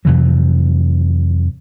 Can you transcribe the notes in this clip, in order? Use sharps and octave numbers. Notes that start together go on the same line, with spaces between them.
F2 C3 E3 F#3